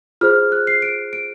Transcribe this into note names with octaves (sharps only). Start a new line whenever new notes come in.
F4 G#4 C5 F6
F#6
C7
D7
D7